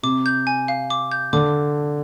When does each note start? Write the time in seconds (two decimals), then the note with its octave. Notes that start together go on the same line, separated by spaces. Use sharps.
0.03 C3 D6
0.26 G6
0.47 G#5
0.68 F5
0.90 D6
1.12 G6
1.33 D3 D6